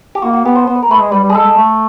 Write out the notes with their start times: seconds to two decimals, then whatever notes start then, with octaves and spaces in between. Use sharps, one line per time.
0.15 G4
0.22 A#3 F#4
0.34 F#4
0.45 B3 G4
0.56 C5
0.67 B3 C5
0.76 B4
0.83 A#4
0.90 A3 B4
1.01 G#3
1.12 G3 B4
1.23 G3
1.30 G#4
1.35 G#3 A4
1.46 G#3
1.57 A3